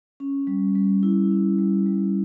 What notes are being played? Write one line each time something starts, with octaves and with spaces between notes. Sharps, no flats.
C#4
G3
G3
E4
C#4
G3
G3